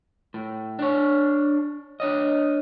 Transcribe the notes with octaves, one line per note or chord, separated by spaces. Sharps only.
A2
D4 C#5
D4 C#5 D#5